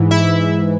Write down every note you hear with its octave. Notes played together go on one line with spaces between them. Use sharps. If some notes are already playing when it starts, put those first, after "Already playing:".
Already playing: G#2 E3
E4 E5